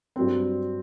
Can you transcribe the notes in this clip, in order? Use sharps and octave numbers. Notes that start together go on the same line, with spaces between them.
G2 F#3 C4